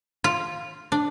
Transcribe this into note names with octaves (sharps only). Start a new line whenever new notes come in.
F4
D4